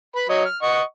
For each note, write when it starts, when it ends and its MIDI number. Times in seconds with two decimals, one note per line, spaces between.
0.16 0.26 71
0.16 0.26 83
0.29 0.45 54
0.29 0.45 73
0.29 0.45 75
0.45 0.58 89
0.63 0.82 75
0.63 0.82 78
0.63 0.82 85